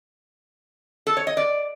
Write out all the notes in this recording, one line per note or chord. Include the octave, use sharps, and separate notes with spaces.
A4
C#5
D#5
D5